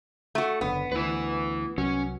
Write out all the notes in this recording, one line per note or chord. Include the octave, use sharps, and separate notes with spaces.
A3 F#4
F#1 B1 D3 B3
D2 E4 B4
C2 F#3 C#4